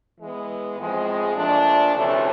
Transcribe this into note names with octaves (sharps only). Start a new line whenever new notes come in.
E3 G#3 B3
A2 F3 G#3 C4
A#2 F3 A3 D4
D2 C3 E3 A3 C#4